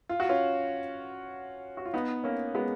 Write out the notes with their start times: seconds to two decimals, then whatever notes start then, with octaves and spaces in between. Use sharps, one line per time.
0.09 F4
0.20 F#4
0.29 C#4 F4
1.77 F#4
1.85 F4
1.93 B3 D#4
2.24 A#3 C#4
2.55 G#3 B3